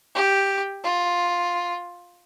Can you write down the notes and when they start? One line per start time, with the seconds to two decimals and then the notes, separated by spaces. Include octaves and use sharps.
0.15 G4
0.84 F4